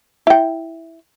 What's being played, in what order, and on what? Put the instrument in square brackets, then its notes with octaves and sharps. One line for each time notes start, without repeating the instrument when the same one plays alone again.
[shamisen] E4 G5